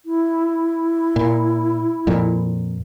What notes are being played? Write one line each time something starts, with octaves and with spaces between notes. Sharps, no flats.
E4
A#2
F2 A#2